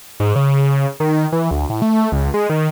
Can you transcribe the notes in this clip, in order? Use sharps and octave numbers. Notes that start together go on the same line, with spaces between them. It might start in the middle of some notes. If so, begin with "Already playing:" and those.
G#2
C#3
D#3
E3
D2
A2
A3
C#2
G#3
D#3